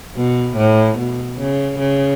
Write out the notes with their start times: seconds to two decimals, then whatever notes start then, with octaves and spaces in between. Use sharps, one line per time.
0.16 B2
0.57 A2
0.98 B2
1.39 C#3
1.80 C#3